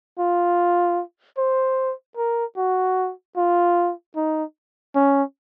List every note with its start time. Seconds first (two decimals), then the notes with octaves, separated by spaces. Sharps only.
0.19 F4
1.38 C5
2.17 A#4
2.57 F#4
3.37 F4
4.16 D#4
4.95 C#4